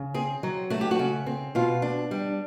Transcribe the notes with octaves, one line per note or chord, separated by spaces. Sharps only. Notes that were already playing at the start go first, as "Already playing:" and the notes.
Already playing: C#3
C4 G#4
F#3
A3 F#4
G4
F#4
C#3
C4
B2 F4
D4
G3